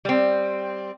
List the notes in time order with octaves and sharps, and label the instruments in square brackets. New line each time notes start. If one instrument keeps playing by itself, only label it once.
[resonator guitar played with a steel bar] G3 C4